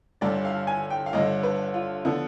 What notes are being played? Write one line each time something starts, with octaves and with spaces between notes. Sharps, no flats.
G1 G2 D3 D5
F5
G#5
G5
F5
G1 G2 D3 D#5
B4
F4
D3 F3 B3